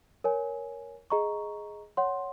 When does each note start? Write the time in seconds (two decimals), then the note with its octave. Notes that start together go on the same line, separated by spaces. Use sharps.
0.24 A#4 C#5 G#5
1.10 G#4 D#5 A#5 C#6
1.97 C#5 F#5 C6